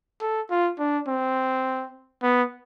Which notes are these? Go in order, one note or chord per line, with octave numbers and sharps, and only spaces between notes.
A4
F4
D4
C4
B3